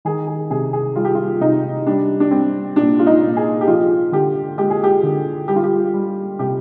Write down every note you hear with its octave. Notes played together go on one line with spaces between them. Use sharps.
D#3 G#4
G#4
C3 G#4
G#4
G3 F4
G4
F4
C3 D#4
G3 D4
D4
G3 C4
A#2 D4
F4
D#4
A#2
G#4
G4
F3 F4
D3 G4
G#3 G4
G#4
G4
D3
G3 G4
F4
G4
G3
C3 G4